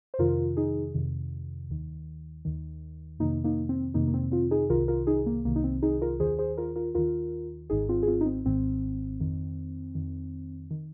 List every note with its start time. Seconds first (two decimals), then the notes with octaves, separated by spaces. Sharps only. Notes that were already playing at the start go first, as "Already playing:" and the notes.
0.14 C5
0.19 F2 C3 D#3 F4 A#4
0.57 D#4 G#4
0.94 F2 C3 D#3
1.70 D#2 D#3
2.45 D#2 D#3
3.19 F2 C3 D#3 A#3 D#4
3.44 A#3 D#4
3.69 C4
3.94 F2 C3 D#3 A#3 D#4
4.08 A#3
4.14 C4
4.32 C4 F4
4.51 D#4 G#4
4.70 C2 C3 D#3 F4 A#4
4.88 F4 A#4
5.07 D#4 G#4
5.26 A#3
5.45 C2 C3 D#3 A#3
5.56 D#4
5.64 C4
5.83 D#4 G#4
6.01 F4 A#4
6.20 D#2 D#3 G#4 C5
6.39 G#4 C5
6.58 F4 A#4
6.76 F4 A#4
6.95 D#2 D#3 F4 A#4
7.70 G#1 G#2 D#3 D#4 G#4
7.89 C4 F4
8.03 G#4
8.08 C4 F4
8.21 D#4
8.26 C4
8.45 G#1 G#2 D#3 C4
9.20 F2 D#3
9.95 F2 D#3
10.71 D#3